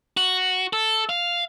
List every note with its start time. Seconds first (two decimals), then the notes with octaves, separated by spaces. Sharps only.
0.17 F#4
0.73 A4
1.09 F5